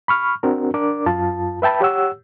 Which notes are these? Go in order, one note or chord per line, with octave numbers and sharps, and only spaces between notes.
B5 C#6 F6
C4 D4 F#4 A#4
D4 A#4 D5 D6
F#2 F4 A5
B4 E5 G5 A5 B5
G4 C#5 F#5 E6